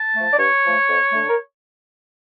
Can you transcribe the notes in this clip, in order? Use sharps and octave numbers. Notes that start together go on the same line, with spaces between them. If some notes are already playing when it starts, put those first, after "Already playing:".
Already playing: A5
F3 A3
D5
G2 C#5
F3 A3
F2
D3 A3
A#4